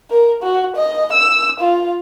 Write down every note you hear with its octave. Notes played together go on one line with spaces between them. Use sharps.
A#4
F#4
D#5
E6
F4